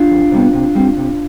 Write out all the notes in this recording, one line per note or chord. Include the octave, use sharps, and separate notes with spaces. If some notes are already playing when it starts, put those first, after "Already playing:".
Already playing: D4 F4
F2
C3 G3 B3
C3
G3 C4
C3